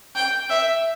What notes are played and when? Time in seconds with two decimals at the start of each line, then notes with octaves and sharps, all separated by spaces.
0.15 G5
0.50 E5